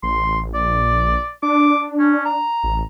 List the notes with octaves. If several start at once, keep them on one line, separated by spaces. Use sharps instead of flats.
A1 C6
A#1 D5
D4 D6
C#4
A#5
A1